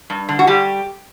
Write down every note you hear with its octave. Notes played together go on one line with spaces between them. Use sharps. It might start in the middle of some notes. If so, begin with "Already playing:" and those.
G2
D3
F#4
G3 G4